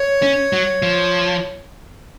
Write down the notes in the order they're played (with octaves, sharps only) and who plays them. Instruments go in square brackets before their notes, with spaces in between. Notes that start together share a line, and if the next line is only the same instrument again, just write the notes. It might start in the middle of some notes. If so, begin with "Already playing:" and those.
Already playing: [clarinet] C#5
[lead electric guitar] C#4
F#3
F3